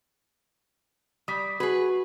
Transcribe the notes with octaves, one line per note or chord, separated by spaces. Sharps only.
G3 D#6 B6
F#4 G#4 B4